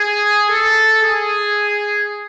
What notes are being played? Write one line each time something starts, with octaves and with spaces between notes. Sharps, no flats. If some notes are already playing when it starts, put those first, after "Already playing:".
Already playing: G#4
A4
G#4